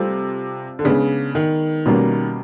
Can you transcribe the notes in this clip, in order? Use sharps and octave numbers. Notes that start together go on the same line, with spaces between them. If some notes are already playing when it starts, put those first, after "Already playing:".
Already playing: C3 G3 C4 F4 A4
D3
C#3 G#3 B3 D4
D#3
B2 G3 A#3 C#4